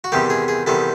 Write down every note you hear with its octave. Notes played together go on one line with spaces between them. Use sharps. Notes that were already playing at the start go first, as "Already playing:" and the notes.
F#4
E2 C3 D#3 G3 G4
G#4
G#4
E2 C3 D#3 G3 A4